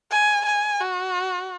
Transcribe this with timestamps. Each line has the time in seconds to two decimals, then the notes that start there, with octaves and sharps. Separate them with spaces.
0.12 G#5
0.46 G#5
0.80 F#4